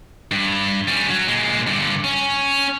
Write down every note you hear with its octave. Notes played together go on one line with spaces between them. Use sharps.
G2
G3 C#4
F#3
A#2 G#3
G2 D3
C#4